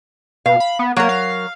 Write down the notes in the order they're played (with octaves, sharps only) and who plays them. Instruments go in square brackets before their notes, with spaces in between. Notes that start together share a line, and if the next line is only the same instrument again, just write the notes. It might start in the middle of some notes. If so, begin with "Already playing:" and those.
[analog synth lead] B2 [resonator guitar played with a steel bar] F5
[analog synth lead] B5
B3
[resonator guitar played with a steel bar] F#3 A#4 [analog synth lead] A#3
[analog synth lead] F5